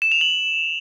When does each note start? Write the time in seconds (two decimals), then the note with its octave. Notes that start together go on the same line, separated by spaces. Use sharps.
0.02 E7
0.12 F7
0.21 F#7